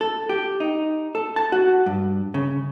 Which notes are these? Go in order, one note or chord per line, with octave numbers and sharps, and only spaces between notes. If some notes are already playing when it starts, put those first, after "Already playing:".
A4
G4
D#4
A4
A5
F#4
G2
C#3